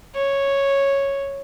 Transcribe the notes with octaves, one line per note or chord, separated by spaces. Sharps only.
C#5